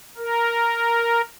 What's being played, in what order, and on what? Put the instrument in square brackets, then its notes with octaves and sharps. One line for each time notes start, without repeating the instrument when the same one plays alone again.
[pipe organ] A#4